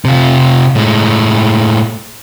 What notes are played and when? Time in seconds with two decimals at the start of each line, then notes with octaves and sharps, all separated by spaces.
0.05 C3 F4
0.75 A2 G#3